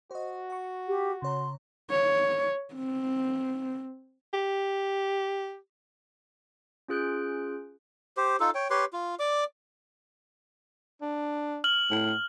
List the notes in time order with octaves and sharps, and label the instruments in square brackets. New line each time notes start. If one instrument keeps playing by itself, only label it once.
[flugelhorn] F#4 [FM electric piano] C5 D#5
[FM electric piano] F#5 C#6
[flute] G4
[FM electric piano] C#3 C#5 A#5 [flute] C6
[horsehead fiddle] C#5
C4
[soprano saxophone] G4
[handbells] C#4 F4 G#4 F#6 G6 D7
[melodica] G4 C5
D#4 F4 A4
C#5 G5
G4 B4 C#5 C6
F4
D5 D6
[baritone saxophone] D4
[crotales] F6 F#7
[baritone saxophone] A2